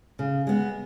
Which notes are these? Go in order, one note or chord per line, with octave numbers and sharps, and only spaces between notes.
C#3
G#3 B3